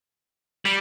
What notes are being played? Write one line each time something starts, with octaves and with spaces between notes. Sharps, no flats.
G3